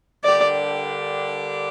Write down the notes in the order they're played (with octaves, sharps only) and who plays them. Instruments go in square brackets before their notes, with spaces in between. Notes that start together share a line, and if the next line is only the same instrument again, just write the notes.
[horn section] D3 G3 A#3 D4 G4 [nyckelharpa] D5